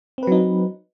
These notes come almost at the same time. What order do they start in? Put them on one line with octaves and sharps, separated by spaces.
C4 B4 F#3 D#4